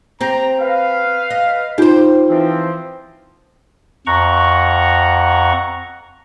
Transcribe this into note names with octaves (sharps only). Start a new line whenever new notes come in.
C4 G4 A#5
B4 F5
D#5
D#4 F4 G4 C5
E3 F3 C4
F2 F#5 A#5 C#6